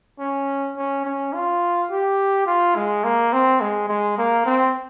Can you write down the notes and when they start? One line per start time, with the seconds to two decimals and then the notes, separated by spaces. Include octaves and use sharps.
0.20 C#4
0.77 C#4
1.05 C#4
1.33 F4
1.91 G4
2.47 F4
2.75 G#3
3.04 A#3
3.33 C4
3.61 G#3
3.89 G#3
4.18 A#3
4.46 C4